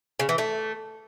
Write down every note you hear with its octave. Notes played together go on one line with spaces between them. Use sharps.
C#3
E3
A3